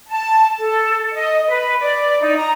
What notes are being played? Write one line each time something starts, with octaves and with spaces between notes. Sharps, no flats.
A5
A4
D#5
B4
D5
D#4
A#5